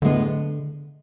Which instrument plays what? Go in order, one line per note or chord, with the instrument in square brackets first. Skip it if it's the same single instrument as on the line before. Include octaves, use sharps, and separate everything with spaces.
[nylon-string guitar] A2 G#3 B3 [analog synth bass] D3